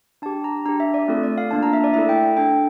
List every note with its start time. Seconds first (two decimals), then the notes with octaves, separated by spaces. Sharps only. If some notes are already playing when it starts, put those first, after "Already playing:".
0.22 D4 A5
0.26 G4
0.44 A#5
0.66 D4 A#5
0.69 G4
0.80 E5
0.94 D5
1.08 A3 C4 F4 A4
1.23 D5
1.38 F5
1.51 A#3 D4 F4 A5
1.63 A#5
1.73 E5
1.84 D5
1.94 A3 E4 A4 E5
2.09 G5
2.37 D4 A4 G5